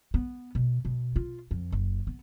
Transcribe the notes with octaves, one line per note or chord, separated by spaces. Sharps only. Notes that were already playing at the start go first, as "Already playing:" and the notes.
B3
B2
B2
F4
F2
F#1
B3